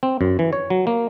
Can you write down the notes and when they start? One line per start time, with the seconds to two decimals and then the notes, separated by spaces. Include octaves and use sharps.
0.03 C4
0.21 F#2
0.39 E3
0.53 C#5
0.70 F#3
0.87 A#3